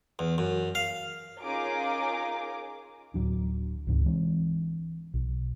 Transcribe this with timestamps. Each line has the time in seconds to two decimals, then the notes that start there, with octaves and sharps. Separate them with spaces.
0.19 E2
0.38 F#2
0.75 F5
1.42 C#4 D#4 F4 G#4 A#4 D6
3.14 D1 G#1 F#3 D4
3.87 C#2 G#2 C3 D#3
4.06 E3 G#3 C4 D4
5.14 B1